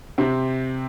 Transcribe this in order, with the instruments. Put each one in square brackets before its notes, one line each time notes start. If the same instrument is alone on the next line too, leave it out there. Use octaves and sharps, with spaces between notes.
[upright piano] C3 C4